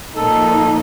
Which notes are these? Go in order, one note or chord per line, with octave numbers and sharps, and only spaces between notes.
A#2 F3 A#3 D#4 A4